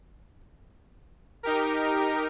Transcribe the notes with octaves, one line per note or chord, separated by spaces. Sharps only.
D#4 G4 A#4